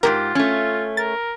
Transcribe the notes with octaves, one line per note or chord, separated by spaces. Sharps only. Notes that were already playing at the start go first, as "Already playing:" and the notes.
G#2 B2 F4 G4 A#4
A3 C#4
A#4 A6